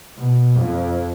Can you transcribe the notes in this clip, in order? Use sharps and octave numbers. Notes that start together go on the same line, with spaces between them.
B2
F2